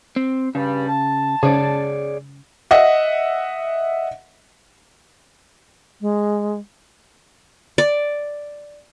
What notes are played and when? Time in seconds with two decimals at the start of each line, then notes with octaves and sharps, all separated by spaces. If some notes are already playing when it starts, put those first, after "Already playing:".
0.16 C4
0.55 G2 C#3 G3
0.88 A5
1.43 C#3 G#4 C#5 D5
2.71 D#5 E5 F#5
6.01 G#3
7.78 D5